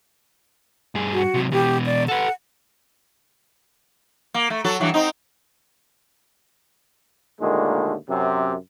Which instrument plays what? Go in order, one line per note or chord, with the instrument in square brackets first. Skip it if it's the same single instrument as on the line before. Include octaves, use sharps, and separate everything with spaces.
[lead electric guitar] G2 G#4
[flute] F#4
[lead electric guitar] C3 F#3
[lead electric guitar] B2 E3 [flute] G4
[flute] D5
[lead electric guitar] A4 B4 [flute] F#5
[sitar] A#3
A3
F#3 F#4 A4
G2 E3 F#3
C4 D#4
[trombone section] D#2 A#2 D3 D#3 G#3 A3
F#2 C3